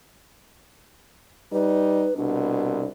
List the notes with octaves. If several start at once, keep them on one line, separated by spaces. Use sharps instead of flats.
G3 D#4 B4
C2 B2 D4